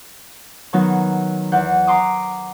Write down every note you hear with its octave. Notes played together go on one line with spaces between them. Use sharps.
D#3 F#3 B3 D#4 F#4
E2 E3 F#5 G6
A#5 C6 D6 D#6